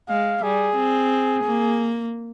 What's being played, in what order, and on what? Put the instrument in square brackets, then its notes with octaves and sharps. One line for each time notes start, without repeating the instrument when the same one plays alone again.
[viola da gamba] G#3 [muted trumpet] F5
[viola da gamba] G3 [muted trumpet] G#4
[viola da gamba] C4
A#3